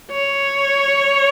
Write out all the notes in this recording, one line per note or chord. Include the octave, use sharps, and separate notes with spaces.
C#5